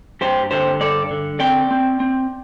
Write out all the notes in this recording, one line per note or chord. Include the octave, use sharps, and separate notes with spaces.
G2 G4 C5
D3 G4 C5
G2 A4 D5
D3
C4 D5 G5
C4
C4